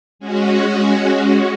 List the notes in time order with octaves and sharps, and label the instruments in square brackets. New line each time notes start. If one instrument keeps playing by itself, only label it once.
[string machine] G#3 C#4 F#4